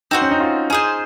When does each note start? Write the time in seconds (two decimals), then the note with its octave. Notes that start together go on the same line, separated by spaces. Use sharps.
0.11 C4 D#4 F#4 C5
0.21 C#4
0.31 D#4
0.40 F4
0.70 C#4 D#4 G#4 C5